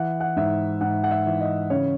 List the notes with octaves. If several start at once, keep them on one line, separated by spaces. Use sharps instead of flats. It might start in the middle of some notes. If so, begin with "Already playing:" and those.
Already playing: E3 F#5
F#5
G#2 E5
G#2 F#5
F#5
E5
E3
D#5
C#3 C#5